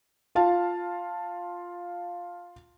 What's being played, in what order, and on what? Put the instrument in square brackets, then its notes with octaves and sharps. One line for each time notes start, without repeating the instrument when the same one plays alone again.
[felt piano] F4 F5 A5